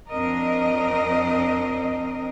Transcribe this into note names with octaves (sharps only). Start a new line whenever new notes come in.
F2 C4 D4 A#4 D#5